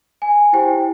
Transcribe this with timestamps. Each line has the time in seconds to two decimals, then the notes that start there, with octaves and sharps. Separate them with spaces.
0.22 G#5
0.53 E4 G4 C5 G5